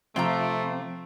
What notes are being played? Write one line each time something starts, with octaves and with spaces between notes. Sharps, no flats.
C3 F3 A3 C4 F4 A#5